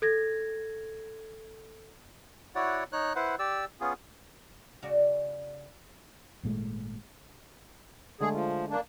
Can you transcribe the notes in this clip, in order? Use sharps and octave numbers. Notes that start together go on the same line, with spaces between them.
A4 G#6 A#6
E4 F#4 C#5 D5 F#5
D#4 C#5 F#6
E4 B4 C5 F#5
G4 D5 E6
B3 C#4 F4 G#4
C#3 F#4 D5
G#1 A#2 G#3 A3
D3 G#3 A3 G#4
F3
A#3 D4